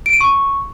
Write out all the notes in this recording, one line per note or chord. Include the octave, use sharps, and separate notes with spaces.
D7
D#7
C#6